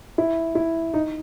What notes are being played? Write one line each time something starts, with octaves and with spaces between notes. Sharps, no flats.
E4
E4
D#4